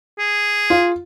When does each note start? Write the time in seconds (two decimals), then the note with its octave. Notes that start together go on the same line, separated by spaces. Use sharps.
0.19 G#4
0.70 F4